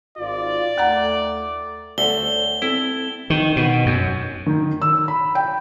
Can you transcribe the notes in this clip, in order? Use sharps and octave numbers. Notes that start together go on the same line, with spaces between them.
G#1 F4 D5
D#2 A3 F#5 A#5
D2 A4 C5 C#5 G7
C4 E4 A4
D#3
B2
F#2
D#3
E6
B5
G5